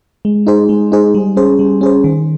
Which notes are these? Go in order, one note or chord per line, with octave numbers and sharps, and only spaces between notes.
G#3
D#4 G#4 C5
G#3
D#4 G#4 C5
G3
C#4 G#4 C5
G3
C#4 G#4 C5
D#3